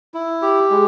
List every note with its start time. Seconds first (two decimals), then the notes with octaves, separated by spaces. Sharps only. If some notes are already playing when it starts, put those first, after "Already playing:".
0.14 E4
0.42 G4
0.70 G#3